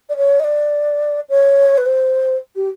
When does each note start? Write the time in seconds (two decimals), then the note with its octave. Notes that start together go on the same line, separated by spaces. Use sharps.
0.09 D5
0.17 C#5
0.40 D#5
0.44 D5
1.29 C#5
1.78 B4
1.86 C5
2.56 G4